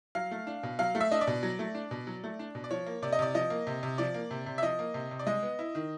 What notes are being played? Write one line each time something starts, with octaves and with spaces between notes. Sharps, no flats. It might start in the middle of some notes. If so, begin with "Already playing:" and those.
F#3 F5
A3
D4
B2
F#3 F5
A3
E5
D4 D#5
D5
B2
F#3
A3
D4
B2
F#3
A3
D4
B2
D5
F3 C#5
A#3
C3 D5
D#5
C3 D5
F3 D#5
A#3
C3
C3
F3 D5
A#3
C3
C3
E5
F3 D#5
A#3
C3
C3
D5
G#3 D#5
B3
E4
D#3